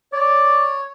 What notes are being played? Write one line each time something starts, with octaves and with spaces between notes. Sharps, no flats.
C#5 D5